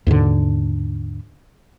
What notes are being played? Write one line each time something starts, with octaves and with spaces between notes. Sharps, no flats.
D#2 G#2 B2 D3